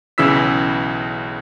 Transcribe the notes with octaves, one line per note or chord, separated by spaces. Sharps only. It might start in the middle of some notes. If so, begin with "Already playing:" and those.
B1 C#3 E3 E4 E6 B6